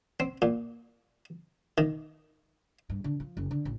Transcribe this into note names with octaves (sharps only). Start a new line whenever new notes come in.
C4
A#2
D#3
G2
D3
F3
F#1
D3
A1